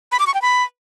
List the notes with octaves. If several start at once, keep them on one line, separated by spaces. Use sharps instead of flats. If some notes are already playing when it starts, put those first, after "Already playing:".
B5
D6
C#6
G5
B5